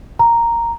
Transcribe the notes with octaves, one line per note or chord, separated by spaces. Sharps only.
A#5